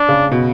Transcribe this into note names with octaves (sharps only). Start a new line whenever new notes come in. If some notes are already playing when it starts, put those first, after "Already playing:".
Already playing: D4
C#3
B2